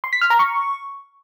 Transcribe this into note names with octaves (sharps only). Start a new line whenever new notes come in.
C6
B6
F6
A#5
C#6